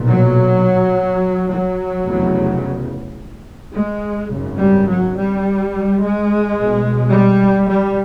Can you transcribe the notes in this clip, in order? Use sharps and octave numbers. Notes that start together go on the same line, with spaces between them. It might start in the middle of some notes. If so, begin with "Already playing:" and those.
Already playing: B1 A#2
F#3
F#3
F1 E2 C#3
G#3
G#1 F#2 C#3
G3
F#3
G3
G#3
B1 B2
G3
G3